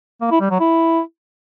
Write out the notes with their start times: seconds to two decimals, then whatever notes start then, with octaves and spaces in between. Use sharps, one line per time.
0.22 A#3
0.31 E4
0.41 G3
0.50 F#3
0.60 E4